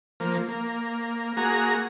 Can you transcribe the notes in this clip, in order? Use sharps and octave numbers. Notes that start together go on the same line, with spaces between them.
F3 A#3
A#3
A#3 F#4 G#4 A#5